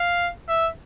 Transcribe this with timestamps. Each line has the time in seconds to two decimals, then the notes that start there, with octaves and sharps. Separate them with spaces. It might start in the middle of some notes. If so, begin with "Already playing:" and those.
Already playing: F5
0.48 E5